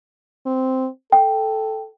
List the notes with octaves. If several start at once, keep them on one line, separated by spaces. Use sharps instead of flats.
C4
A4 G5